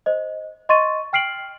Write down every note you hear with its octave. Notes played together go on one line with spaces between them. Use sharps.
C5 D#5
D#5 C6 C#6 A6 D#7
G5 F6 C7 D7 F#7